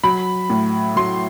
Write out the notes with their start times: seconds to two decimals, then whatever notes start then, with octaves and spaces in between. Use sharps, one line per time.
0.04 F#3 B5
0.50 A2
0.96 F#3 C6